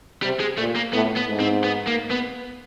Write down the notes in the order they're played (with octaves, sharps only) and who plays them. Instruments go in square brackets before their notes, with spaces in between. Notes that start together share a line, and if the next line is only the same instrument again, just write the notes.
[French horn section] C3 [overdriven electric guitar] G3
[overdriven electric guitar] G#3
[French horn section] A#2 [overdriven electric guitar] A3
[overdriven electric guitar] A#3
[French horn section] A2 [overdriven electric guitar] B3
[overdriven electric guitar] B3
[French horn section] G#2
[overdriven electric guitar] C4
B3
A#3
B3